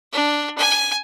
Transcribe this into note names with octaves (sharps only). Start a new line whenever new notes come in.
D4
G#5